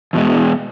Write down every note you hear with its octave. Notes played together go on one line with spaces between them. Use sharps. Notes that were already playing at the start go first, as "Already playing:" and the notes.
E2 B2 G#3